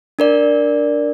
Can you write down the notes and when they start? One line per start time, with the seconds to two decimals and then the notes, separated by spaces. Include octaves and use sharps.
0.19 D4 A#4 D5